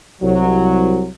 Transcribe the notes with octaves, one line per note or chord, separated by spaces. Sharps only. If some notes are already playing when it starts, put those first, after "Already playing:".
C2 F#3